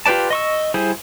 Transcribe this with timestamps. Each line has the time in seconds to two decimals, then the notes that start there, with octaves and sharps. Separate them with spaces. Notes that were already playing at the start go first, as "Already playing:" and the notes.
0.06 F4 G4 B4 D5 A5
0.30 D#5 C#6 E6
0.74 G3 E4 G#4 C5